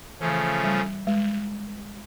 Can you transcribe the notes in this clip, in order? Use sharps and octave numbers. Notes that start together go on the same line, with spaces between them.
C#3 E3 F3 A3 C#4
G3
G#3